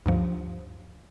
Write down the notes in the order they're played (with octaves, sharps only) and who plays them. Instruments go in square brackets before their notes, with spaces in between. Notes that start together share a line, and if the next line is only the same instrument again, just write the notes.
[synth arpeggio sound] D2 G2 F3